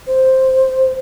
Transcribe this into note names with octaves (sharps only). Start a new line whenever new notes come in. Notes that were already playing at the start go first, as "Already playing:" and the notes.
C5